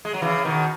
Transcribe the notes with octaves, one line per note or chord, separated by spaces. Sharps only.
G#3
F#3
C#3 E3
B2 D#3